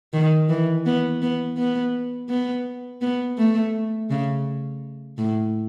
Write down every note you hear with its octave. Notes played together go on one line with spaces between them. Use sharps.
D#3
E3
B3
B3
B3
B3
B3
A3
C#3
A2